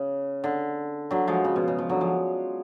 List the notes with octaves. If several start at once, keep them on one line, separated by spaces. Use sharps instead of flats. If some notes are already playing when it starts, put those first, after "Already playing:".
Already playing: C#3
D3
D3 F#3
F3 G#3
C#3
B2
C#3
F3
D3 F#3
F3 G#3